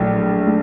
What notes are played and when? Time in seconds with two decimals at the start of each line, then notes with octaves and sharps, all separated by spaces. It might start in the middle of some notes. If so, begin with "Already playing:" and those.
Already playing: A#1 A2 F#3 A3
0.47 A3